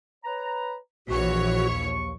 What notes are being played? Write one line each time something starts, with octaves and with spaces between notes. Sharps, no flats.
B4 C#5 A#5
A#1 E3 F#4 C#5
D#2 C#6